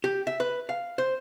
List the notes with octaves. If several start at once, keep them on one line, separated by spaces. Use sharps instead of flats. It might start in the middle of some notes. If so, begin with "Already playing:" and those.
G4
E5
B4
F5
C5